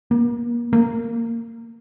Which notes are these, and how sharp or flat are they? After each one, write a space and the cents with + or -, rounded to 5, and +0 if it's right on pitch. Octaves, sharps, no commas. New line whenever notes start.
A#3 +35
A#3 -20